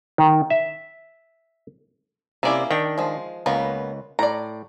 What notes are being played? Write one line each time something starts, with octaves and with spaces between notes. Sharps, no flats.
D#3
E5
C3 A#3 C#4 E4 D5
D#3 D4 G5
F3 G#3
C#2 A#3 B3 C#4
A2 D5 A#5